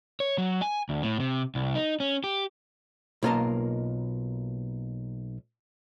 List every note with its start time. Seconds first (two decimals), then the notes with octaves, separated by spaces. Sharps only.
0.20 C#5
0.38 F#3
0.62 G#5
0.89 D2
1.03 A2
1.20 C3
1.55 C2
1.75 D#4
2.00 C#4
2.24 G4
3.23 B1 A#3 F4 A#4 D#5 A5